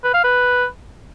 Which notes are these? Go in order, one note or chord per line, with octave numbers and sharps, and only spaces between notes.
B4
F5
B4